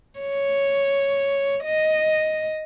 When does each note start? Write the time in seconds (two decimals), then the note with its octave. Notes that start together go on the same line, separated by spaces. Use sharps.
0.19 C#5
1.64 D#5